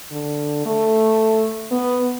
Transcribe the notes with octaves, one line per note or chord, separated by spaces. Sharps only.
D3
A3
B3